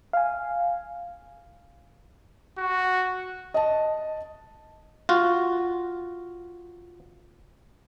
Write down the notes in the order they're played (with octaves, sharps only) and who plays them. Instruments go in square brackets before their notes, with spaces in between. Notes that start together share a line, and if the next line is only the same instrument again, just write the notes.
[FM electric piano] F5 G#5
[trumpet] F#4
[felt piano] D#5 A5
[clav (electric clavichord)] F4 F#4